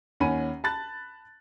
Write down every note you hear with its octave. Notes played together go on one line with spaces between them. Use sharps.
D#2 C#4 F#5 G#5 B5 D#7
A5 B5 F#6 A6